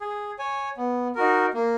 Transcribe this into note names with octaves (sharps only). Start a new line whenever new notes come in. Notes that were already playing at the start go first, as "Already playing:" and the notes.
G#4
C#5 G#5
B3
D#4 F#4 A#4
A#3